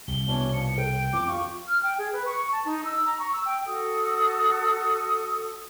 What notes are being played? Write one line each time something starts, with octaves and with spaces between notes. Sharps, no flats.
C2 C3 G7
B2 E3 C#4 D4
F3 C#7
A#4 G5 D7
F2 D6
F4 F5 C#6
F6
G5
G#4
B4
C#6
A5
D#4
E6
A#5
C#6
E6
G5
F#4 A4 D#6